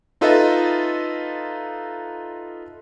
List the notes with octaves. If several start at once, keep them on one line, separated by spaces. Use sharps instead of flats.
D#4 F4 A4 B4 D#5 E5